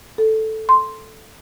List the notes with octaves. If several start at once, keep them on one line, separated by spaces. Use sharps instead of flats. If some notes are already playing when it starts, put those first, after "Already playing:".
A4
C6